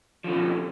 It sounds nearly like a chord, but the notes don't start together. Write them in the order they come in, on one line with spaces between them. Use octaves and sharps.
F3 D3 C#4 B2